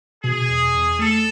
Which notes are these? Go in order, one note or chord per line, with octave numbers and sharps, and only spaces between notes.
B2 G#4
E2
E2
A3 A4